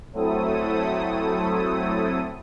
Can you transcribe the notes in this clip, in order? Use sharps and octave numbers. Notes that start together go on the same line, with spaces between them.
F#3 A3 C4 E4 A4 D#6